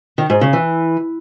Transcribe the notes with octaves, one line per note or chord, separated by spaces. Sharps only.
D#3
G#2
C#3
E3